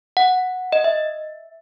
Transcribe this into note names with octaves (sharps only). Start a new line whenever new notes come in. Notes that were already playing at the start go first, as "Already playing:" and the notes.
F#5
D#5
E5